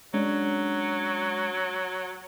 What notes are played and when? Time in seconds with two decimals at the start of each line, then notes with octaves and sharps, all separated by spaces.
0.14 F#3 G#3 C#4 D4